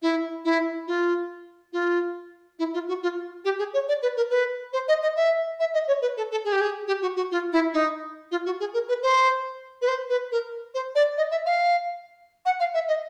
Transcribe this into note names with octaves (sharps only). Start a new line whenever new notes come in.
E4
E4
F4
F4
E4
F4
F#4
F4
G4
G#4
C#5
D5
B4
A#4
B4
C5
D#5
D#5
E5
E5
D#5
C#5
B4
A4
A4
G#4
G4
G#4
G4
F#4
F#4
F4
E4
D#4
F4
F#4
G#4
A#4
B4
C5
B4
C5
B4
A#4
C5
D5
D#5
E5
F5
F#5
F5
E5
D#5